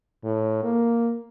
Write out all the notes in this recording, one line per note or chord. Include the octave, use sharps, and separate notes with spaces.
A2
A#3